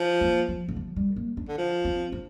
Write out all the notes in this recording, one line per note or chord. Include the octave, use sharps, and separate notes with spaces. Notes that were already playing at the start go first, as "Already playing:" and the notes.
Already playing: F3
A#3
F3
D3
F3
G3
A#3
D4
D3
F3
C4
D4